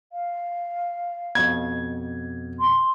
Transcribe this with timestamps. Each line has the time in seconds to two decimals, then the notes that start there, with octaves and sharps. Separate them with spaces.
0.13 F5
1.35 F2 B2 G#6
2.59 C6